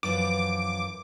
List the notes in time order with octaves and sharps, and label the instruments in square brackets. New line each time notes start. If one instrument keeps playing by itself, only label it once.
[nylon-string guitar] F#2 E3 F3 [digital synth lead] D6